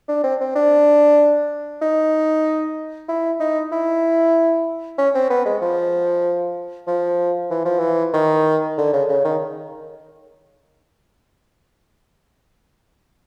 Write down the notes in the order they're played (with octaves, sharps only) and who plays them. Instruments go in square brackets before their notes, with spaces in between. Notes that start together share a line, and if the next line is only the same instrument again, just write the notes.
[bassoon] D4
C4
C4
D4
D#4
E4
D#4
E4
C#4
C4
B3
G#3
F3
F3
E3
F3
E3
D#3
D3
C#3
C#3
D#3